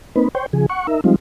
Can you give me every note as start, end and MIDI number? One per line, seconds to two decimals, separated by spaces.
0.16 0.29 58
0.16 0.29 60
0.16 0.29 63
0.16 0.29 71
0.35 0.46 72
0.35 0.46 73
0.35 0.46 79
0.53 0.66 49
0.53 0.66 53
0.53 0.66 68
0.69 0.87 78
0.69 0.87 85
0.87 1.01 63
0.87 1.01 70
0.87 1.01 76
1.04 1.16 53
1.04 1.16 55
1.04 1.16 56
1.04 1.16 60
1.04 1.16 63
1.04 1.16 65